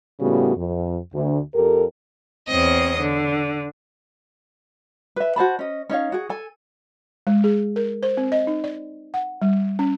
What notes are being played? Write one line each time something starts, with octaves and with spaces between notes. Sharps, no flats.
A2 C#3 G3 B3 F#4
F2
D2
F2 G4 A4 A#4
E2 C4 C#5 D#5 D#6
D3
B4 E5
F#4 C5 A5 B5
C#4 D#5
C#4 D#4 C#5 F5
F#4 G#4
A4 G#5
G#3
G#4
A#4
C5
C4
D#5
D#4
D5
F#5
G3
C#4